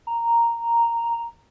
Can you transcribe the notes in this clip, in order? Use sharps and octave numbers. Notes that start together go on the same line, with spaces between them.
A#5